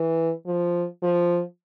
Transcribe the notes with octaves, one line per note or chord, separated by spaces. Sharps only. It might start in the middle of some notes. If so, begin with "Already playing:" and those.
Already playing: E3
F3
F3